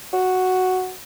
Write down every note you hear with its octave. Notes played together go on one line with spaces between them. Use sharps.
F#4